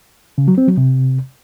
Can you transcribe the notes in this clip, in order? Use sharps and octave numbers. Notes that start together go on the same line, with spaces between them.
C#3
F#3
C4
F#3
C3